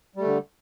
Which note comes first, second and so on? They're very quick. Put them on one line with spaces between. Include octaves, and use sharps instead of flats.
G3 A3 D3